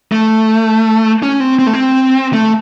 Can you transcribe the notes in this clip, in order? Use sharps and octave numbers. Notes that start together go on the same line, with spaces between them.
A3
C#4
C4
C4
A3
C4
A3